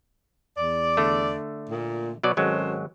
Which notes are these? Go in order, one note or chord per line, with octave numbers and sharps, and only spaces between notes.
E2 D5
D3 A3
A#2
B2 F#3 D5
G#1 F#3 G#3 C#4 A4 C5